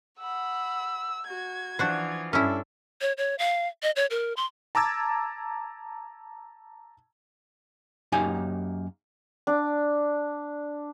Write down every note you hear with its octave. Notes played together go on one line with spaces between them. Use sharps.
F#5 B5 E6
F#4 G#6
E3 F3 D4 F4 F#4 C5
G2 C#4 D4 E4 A4 E5
C#5
C#5
F5
D#5
C#5
A#4
C6
A5 A#5 D6 E6 G#6 A6
F#2 A#3 D#4 G4 G#5
D4